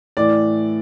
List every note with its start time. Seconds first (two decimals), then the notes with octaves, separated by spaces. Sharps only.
0.17 A2 E3 D5